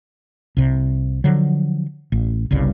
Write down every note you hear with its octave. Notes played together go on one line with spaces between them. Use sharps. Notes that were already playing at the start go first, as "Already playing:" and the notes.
C2 C3
D3 F3 F#3
A1
G1 C2 G2 C#3